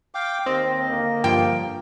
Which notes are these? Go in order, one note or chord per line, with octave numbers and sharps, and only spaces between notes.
F5 G5 D6
D#2 C4 D#5
D3 A#3
G2 F3 G5